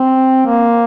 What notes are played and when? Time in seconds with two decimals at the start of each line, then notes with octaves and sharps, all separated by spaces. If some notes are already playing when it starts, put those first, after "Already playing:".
Already playing: C4
0.46 A#3